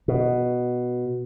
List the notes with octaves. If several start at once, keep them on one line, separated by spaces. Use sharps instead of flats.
B2